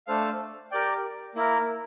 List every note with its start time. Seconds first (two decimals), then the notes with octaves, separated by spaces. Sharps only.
0.07 A3 D4 A4 C5 F5
0.71 G4 A#4 D5 G5
1.35 A#3 E4 A#4